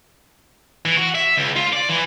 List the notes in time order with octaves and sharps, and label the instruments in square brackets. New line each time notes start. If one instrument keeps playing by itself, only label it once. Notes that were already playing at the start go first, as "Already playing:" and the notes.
[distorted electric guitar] E3
F#4
E5
C#2
F4
D5
E3